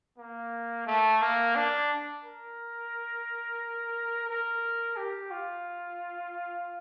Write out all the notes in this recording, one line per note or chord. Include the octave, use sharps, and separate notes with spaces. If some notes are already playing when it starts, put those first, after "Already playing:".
A#3
A3
A#3
D4
A#4
A#4
G4
F4